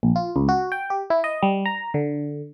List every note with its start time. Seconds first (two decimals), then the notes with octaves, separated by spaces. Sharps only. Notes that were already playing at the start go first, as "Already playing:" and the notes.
0.03 A#1
0.16 F4
0.36 C#2
0.49 F#4
0.72 G5
0.90 G4
1.10 E4
1.24 D#5
1.43 G3
1.66 A#5
1.94 D3